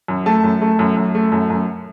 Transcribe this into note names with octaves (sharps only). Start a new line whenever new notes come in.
F#2
A3 A5
F#2
A3
F#2
F#2
A3
F#2
F#2